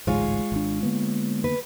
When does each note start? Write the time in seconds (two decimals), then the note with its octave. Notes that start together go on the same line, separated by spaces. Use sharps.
0.07 A1 D2 G#2 G#3 F4 C#5
0.52 G#1 D4
0.83 D3 A#3 B3
1.44 B4